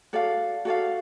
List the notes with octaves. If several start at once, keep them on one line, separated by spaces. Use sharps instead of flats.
F#4 A4 D5 F5
F#4 A4 D5 F5